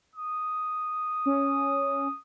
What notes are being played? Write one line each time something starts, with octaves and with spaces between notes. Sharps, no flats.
D#6
C#4